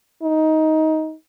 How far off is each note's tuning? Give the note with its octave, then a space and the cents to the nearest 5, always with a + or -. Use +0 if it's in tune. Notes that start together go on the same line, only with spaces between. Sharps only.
D#4 +15